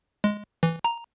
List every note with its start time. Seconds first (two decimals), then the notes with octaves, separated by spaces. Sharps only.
0.24 G#3
0.63 E3
0.84 A#5